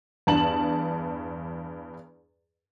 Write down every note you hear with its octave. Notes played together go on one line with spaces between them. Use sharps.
E2 G2 A5 F#7